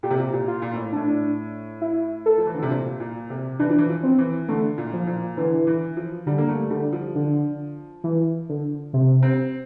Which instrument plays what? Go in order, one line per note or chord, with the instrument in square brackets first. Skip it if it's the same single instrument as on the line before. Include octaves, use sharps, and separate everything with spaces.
[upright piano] A#2 [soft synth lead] G4
[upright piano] C3
A#2
A#2
[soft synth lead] F4
[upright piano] A#2
A2
[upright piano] A2 [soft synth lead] D4
[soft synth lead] E4
A4
[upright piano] F3
E3
D3
C3
A#2
A#2
C3
[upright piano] E3 [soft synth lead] D4
[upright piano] F3
E3
F3
[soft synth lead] C4
[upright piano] E3
[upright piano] D3 [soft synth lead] A3
[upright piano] A#2
[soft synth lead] F3
[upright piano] A#2
[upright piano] D3 [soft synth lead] E3
[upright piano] E3
F3
[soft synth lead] D3 [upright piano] G3
[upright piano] A#3
A3
[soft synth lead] D3 [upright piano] G3
[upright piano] F3
[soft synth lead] D3
E3
D3
C3
[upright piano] C4